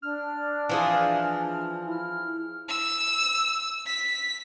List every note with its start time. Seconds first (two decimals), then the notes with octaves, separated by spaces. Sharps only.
0.02 D4 F6
0.69 E3 F3 G#4
1.87 E4 F6
2.69 E6
3.87 B6